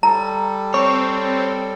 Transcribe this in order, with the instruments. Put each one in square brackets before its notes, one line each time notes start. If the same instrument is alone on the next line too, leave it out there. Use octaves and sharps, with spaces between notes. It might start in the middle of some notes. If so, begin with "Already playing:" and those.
[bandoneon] G3 A4 [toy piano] A#5
[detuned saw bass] C4 [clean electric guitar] C#5